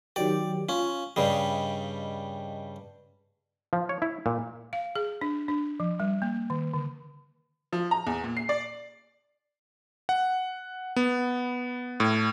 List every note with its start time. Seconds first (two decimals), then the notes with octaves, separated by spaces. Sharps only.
0.16 D#3 F#3 G4 D5
0.69 C#4 F4
1.16 G2 C#3 G3 D#5
3.73 F3
3.89 C#5
4.02 E4
4.26 A#2
4.73 F5
4.95 G#4
5.21 D4
5.48 D4
5.80 F3
6.00 G3
6.22 A#3
6.50 D#3
6.74 D3
7.73 F3
7.91 A#5
8.07 E2
8.24 A#2
8.37 C7
8.49 D5
10.09 F#5
10.96 B3
12.00 A2